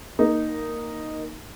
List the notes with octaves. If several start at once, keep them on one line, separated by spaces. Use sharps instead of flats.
A#3 D#4